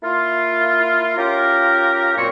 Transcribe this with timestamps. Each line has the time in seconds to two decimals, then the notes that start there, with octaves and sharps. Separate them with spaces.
0.03 A#3 E4 F4
1.17 C#4 F4 G4 A#4
2.17 F#2 A#2 C4 C#5 C#6